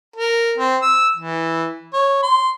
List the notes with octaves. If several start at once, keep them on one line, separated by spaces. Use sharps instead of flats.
A#4
C4
E6
E3
C#5
C6